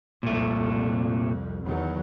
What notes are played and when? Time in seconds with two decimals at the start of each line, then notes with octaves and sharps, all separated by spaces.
0.23 C2 F2 A#2 A3
1.65 E2 D#3 F#3